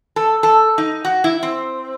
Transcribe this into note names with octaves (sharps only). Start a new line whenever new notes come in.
A4
A4
D#4
F#4
E4
C4